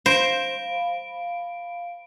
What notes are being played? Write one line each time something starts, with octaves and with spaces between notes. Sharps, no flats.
C5 F5 B5 D7